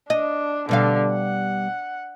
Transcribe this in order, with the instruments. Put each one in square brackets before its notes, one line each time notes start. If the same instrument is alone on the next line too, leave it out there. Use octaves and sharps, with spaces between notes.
[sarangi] D4 [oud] D#5
[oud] B2 G3 F5 [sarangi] D3
[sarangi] F#5